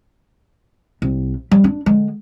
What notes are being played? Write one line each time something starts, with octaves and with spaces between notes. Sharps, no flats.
C2
G3
D4
D3 G#3